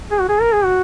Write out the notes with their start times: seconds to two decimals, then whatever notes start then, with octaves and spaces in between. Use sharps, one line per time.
0.11 G#4
0.20 F#4
0.29 G#4
0.41 A#4
0.53 G#4
0.64 F#4